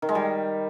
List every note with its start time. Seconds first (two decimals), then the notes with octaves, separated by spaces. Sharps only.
0.02 D#3
0.09 G#3
0.15 G3